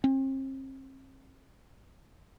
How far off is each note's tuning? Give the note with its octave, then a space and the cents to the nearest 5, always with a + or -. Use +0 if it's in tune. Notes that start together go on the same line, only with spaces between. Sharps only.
C4 +40